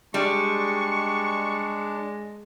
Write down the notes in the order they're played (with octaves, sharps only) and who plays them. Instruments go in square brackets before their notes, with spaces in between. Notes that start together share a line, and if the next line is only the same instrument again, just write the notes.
[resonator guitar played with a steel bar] G3 [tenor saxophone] G#3 [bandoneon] D4 [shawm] C#6